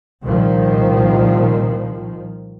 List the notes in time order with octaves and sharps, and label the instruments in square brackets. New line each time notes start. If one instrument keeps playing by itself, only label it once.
[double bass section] C2 A#2 D#3 F3